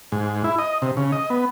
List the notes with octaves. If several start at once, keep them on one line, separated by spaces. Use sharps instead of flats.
G#2
E4
D#5
C3
C#3
D#5
B3